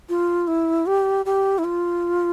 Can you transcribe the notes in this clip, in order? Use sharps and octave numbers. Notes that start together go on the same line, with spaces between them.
F4
E4
G4
G4
E4
F4